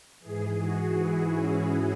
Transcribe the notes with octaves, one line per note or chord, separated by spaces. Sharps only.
G#2 E3 G#4
F#4
E4
C#4